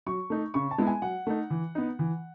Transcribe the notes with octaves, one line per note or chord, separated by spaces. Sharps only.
F#3 C#6
A3 D#4
C#3 C#6
A5
G#3 B3 E4
G#5
F#3 F#5
A3 D#4
E3
B3 D#4
E3